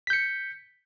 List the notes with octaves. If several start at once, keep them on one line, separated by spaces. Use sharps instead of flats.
G6 B6 C#7